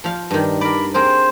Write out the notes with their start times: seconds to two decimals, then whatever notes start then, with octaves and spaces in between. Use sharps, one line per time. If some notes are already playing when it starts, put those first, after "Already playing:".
0.04 F3 F5
0.31 G2 D#3
0.61 A#4 D5 B5
0.94 C4 G#4 A#4 C5